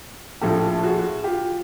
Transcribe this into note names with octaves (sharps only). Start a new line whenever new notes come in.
A#1 A2 F3 G4 A4
F#4 G#4
F4 G4